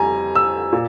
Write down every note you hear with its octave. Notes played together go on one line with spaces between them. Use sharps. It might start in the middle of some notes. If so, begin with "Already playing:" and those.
Already playing: F2 G3 G#5 A#5
E6
A#2